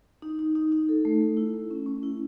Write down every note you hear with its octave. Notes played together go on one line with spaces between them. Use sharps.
D#4
D#4
D#4
D#4
A4
A3
A3
E4
A3
C#4
C#4
E4